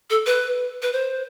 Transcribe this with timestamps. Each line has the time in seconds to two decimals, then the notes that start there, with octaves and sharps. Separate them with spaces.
0.10 A4
0.26 B4
0.82 B4
0.93 C5